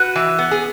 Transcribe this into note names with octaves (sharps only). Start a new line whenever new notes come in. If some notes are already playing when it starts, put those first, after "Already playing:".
Already playing: F#4 B4
E3
B3
G#4